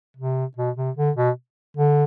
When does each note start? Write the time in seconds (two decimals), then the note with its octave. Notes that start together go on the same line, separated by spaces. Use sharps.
0.17 C3
0.57 B2
0.77 C3
0.97 D3
1.16 B2
1.77 D3